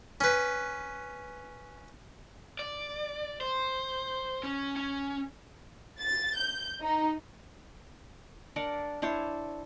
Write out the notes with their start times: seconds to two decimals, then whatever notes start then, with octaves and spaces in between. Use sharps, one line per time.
0.21 C#4 B4
2.59 D5
3.41 C5
4.43 C#4
4.77 C#4
6.01 A6
6.36 G6
6.82 D#4
8.56 D4 A#4 D5 F#5
9.02 D4 E4 C5 C#5